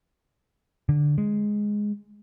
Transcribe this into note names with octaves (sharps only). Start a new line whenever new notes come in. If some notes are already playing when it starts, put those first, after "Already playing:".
D3
G#3